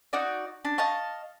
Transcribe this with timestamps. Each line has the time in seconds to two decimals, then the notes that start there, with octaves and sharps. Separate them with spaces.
0.13 D#4 F#4 D5
0.65 D4
0.78 D#5 F5 A5 C#6